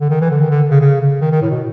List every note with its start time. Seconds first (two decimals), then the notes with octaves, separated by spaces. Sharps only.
0.01 D3
0.10 D#3
0.21 E3
0.31 D3
0.40 D#3
0.50 D3
0.71 C#3
0.81 C#3
1.01 C#3
1.21 D#3
1.31 D#3
1.42 A2
1.50 B2